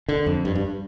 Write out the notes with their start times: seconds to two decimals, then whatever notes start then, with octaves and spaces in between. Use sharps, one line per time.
0.09 D3
0.26 F2
0.45 G2
0.55 G2